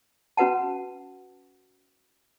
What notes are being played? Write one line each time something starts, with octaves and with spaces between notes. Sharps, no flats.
C#4 F#4 B4 F#5 A5